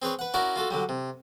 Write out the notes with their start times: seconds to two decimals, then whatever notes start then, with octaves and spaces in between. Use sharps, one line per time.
0.02 C4 G#4 B4 C#5
0.19 B4 F#5
0.34 C#4 E4 F#4 A#4 D5 F#5
0.56 F4 F#4 A4
0.71 D3 F#3 G3
0.89 C3